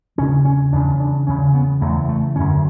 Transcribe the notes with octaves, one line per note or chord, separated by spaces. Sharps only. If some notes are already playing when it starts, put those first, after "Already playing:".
E2 C#3 C#4
C#4
E2 C#3 D4
D4
E2 C#3 C#4
B3
E2 C#3 A3
A3
F#2 D3 C#4